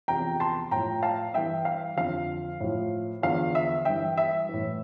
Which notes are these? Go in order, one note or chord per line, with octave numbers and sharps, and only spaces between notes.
E2 C3 F3 G5 A#5
A5 C6
A2 F3 G5 A#5
F5 A5
G2 E3 E5 G5
F5
F2 D3 F3 F5
A2 F3
E2 D3 F3 F5
E5
G2 E3 E5 G5
E5
A2 E3